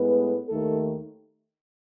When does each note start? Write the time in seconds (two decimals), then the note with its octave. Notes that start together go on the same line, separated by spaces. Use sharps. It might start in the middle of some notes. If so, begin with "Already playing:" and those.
Already playing: A2 G#3 B3 B4
0.49 D#2 D#3 A3 A4